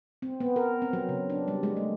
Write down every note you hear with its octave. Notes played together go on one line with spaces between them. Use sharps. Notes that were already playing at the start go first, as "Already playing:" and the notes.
C4
B3
A#4
C4
F#3
C#3
D4
G3
G#3
A3